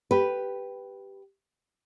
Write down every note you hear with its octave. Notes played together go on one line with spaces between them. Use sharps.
G4 B4